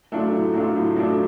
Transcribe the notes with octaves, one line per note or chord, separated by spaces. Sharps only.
F#3 A3 D4 F4
A2
F#3 A3 D4 F4
A2
F#3 A3 D4 F4